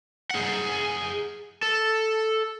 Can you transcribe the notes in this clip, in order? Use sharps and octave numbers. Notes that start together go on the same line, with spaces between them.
G#4 F#5
A4